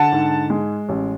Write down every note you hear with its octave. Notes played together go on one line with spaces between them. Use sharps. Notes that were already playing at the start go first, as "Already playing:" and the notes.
Already playing: D3 F#5 A5
G#2
G#3
A1